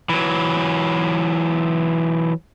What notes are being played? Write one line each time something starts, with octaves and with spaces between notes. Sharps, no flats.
E3 F#3